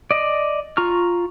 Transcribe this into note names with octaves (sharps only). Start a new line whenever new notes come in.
D5 D#5
F4 A#5 C#6 F6